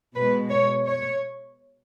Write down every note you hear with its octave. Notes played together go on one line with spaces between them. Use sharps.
B2 G#3 B4
C#5
C#5